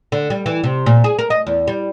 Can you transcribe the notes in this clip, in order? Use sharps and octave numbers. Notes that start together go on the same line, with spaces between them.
D3
G3
E3
C3
A#2
G#4
A#4
D#5
E2
G3